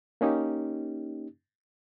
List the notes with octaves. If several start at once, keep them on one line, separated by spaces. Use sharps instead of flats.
A#3 C#4 D#4 G4